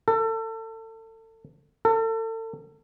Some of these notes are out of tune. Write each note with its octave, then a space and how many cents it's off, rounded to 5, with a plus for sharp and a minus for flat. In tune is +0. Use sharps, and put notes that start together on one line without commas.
A4 +30
A4 +35